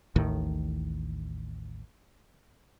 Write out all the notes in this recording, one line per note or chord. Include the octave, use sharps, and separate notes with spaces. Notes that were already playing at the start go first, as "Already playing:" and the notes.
A1 D#2 A2 D#3